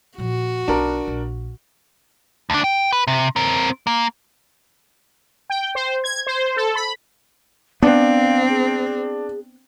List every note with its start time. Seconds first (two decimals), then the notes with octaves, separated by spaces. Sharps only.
0.18 A#2 F3 F#4
0.68 B1 D4 D#4 A#4
1.07 A#1
2.50 D2 D4
2.64 G5
2.92 B4
3.07 C3
3.36 C4 A#4
3.87 A#3
5.50 G5
5.75 C5
6.04 G#6
6.27 C5
6.57 A4
6.75 B5
7.83 B3 C4 D4 F5
8.49 G#4